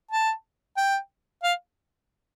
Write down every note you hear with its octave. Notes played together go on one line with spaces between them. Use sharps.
A5
G5
F5